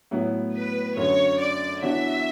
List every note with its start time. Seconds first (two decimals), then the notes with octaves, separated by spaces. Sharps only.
0.11 A2 F#3 B3 E4
0.54 B4
0.97 F#2 D3 F#3 C#5
1.39 D5
1.82 E3 B3 D4 F#4 C#5 E5